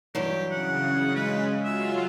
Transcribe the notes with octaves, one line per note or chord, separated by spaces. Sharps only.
G2 E3 F#3 G4
C#3 F#5
G#3 B4
F#3 F4 E5